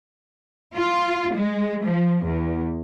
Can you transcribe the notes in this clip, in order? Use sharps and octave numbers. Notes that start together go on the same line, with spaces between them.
F4
G#3
F3
E2